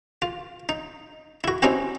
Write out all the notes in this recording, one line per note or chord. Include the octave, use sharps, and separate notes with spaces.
F4
D#4
E4 F#4
C4 C#4 D#4 E4 F#4 G4